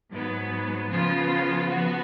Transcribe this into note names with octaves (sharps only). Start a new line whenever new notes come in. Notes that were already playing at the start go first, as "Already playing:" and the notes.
G#2 F#3 B3
C#3 F3 B3 F4
F3 B3 F#4